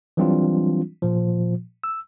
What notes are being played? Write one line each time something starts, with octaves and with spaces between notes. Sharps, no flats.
E3 F#3 G3 C4 D4 F4
A#2 F3
E6